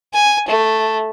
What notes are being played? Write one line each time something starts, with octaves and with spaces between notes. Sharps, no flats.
G#5
A3